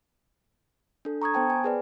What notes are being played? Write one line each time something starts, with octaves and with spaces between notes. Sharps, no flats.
D4 A4
A#5 C#6 D#6 G#6
B3 C5 G5 A5
G#5
G#4 B4 D5